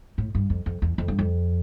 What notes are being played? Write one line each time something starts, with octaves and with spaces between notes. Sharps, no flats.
A2
G2
F2
F2
E2
F2
G2
F2